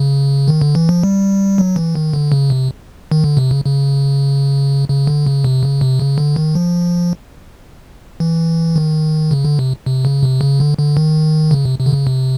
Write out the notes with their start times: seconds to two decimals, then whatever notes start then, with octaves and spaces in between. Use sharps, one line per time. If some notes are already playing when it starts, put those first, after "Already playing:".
Already playing: C#3
0.48 D#3
0.61 D3
0.75 E3
0.89 F3
1.04 G3
1.58 F#3
1.76 E3
1.95 D#3
2.13 D3
2.32 C#3
2.50 C3
3.12 D#3
3.24 D3
3.37 C3
3.51 C#3
3.65 C#3
4.89 C#3
5.07 D3
5.27 C#3
5.44 C3
5.63 C#3
5.81 C3
5.99 C#3
6.18 D3
6.36 D#3
6.55 F3
8.20 E3
8.76 D#3
9.31 C#3
9.45 D3
9.59 C3
9.86 C3
10.05 C#3
10.23 C3
10.41 C#3
10.60 D3
10.78 D3
10.97 D#3
11.51 C#3
11.65 C3
11.80 C3
11.86 D3
11.93 C#3
12.07 C3